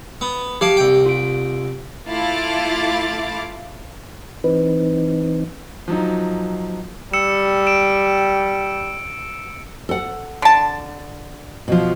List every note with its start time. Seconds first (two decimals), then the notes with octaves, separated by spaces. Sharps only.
0.21 B3
0.61 F3 G4 F5 D7
0.77 C2 G5
1.06 F4 D7
2.09 A3 E4 F4 F5 D6 A6
4.44 E3 C4 D#4 B4
5.88 F3 F#3 D#4
7.13 G3 E6 C#7 E7
7.67 D7 E7
9.89 A4 F#5
10.42 D3 A5
11.68 B2 F3